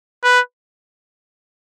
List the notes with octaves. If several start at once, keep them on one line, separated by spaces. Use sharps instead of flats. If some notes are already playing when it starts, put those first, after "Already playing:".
B4